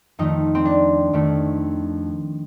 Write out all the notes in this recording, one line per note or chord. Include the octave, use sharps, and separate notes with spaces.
F2 D#3 A3 D#4
C4
D4
F2 D#3 A3